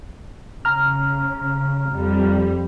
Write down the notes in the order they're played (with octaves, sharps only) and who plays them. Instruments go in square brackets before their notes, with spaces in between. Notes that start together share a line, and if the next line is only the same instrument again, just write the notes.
[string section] C#3 [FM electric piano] A#5 F6
[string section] F2 G3